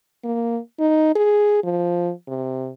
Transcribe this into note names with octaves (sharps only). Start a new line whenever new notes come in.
A#3
D#4
G#4
F3
C3